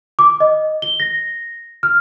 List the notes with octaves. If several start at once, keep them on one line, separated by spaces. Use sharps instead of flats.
D6
D#5
G7
A#6
F6